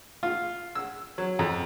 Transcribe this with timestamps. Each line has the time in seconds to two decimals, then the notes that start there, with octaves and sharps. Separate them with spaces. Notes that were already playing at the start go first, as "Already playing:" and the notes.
0.23 F4
0.75 E6
1.18 F#3
1.39 F2